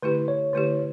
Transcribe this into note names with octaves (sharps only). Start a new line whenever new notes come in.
D3 A3 E4 G4 B4
C#5
D3 A3 E4 G4